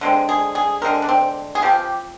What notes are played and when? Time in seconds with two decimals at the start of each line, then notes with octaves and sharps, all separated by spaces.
0.01 D3 G#3 C4
0.29 G#4
0.55 G#4
0.81 D3 G#3 C4 A#4
1.02 D4
1.09 C4
1.55 G#4
1.62 F3 C4 G4